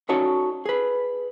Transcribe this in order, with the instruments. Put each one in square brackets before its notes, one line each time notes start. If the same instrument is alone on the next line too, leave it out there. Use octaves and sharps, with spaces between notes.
[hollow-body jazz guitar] C#4 D#4 F#4 A4 C#5 D5
G#4 B4